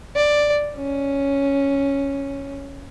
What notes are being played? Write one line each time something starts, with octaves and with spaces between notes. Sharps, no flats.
D5
C#4